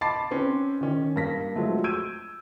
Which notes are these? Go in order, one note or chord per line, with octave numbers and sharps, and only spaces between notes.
D#5 A5 B5 D6 A6 C7
C4 C#4 B4 C5
D#3 C#4
G2 A#3 A#6 B6
F3 F#3 G#3 A3
E6 G6 G#6 D7 D#7